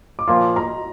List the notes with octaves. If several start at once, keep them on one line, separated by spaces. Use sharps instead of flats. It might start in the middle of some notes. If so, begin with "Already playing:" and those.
D6
A#2 F3 A#3 F4 C6
A#5